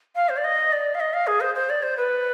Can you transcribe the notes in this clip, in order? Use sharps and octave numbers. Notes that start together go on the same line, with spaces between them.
F5
C5
D5
D#5
D5
F5
D#5
F5
G#4
C5
C5
D5
C5
B4